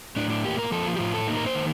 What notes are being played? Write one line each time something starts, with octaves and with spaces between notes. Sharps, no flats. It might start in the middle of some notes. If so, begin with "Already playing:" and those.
A2 D4
D4
A#3 G4
A#4
F3 A4
F4
G4
A2 F4
A4
A#3 D#4
A#4
C5
D#3